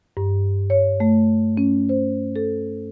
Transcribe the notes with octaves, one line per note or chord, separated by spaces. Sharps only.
G2
C#5
A3
C#4
C5
A4